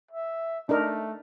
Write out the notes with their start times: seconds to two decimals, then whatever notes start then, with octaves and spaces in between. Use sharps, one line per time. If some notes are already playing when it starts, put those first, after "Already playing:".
0.11 E5
0.69 A3 D4 D#4 A#4